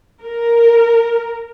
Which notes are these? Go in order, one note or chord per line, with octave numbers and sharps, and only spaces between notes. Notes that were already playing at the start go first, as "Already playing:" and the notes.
A#4